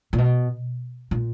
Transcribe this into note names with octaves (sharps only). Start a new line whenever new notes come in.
A#2
B2
A#2